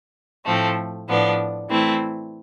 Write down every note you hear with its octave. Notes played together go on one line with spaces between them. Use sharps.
A2 F3 A3 C4
A2 F3 B3 D4
E3 A3 C4 E4